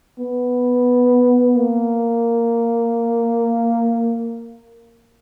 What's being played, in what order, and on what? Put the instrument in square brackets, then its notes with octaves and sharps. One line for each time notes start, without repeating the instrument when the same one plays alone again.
[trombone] B3
A#3